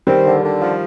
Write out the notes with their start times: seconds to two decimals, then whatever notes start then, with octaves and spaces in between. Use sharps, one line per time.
0.07 D#3 G3 C4
0.25 D3
0.43 D3
0.61 F3